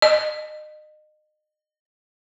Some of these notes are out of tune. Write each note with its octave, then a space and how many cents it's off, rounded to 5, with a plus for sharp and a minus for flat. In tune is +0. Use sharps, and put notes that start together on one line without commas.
D#5 -30